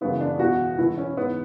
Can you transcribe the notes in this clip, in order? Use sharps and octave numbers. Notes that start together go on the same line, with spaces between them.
F#2 C#3 E3 B3
D4
E2 B2 F#4
E2 B2 E4
C#4
G#2 E3 B3